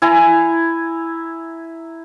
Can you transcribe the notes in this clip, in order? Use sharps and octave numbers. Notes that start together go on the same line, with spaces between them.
E4 G#5 A#5